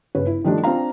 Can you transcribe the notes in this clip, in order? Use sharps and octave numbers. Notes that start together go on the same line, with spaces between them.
G1 C#3 B4 C#5
E4
D#3 F3 G3 A3 D4
C4 D4 F4 F5 A#5